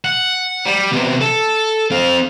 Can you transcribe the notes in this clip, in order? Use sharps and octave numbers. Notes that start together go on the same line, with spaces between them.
F#5
G3
C3 B3
A4
C4 F5